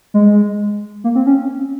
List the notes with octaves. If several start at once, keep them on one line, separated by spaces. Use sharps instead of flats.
G#3
A#3
C4
C#4